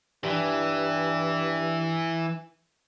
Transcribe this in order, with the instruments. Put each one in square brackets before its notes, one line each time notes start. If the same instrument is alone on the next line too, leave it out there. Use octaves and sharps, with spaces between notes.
[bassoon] G2 [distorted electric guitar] E3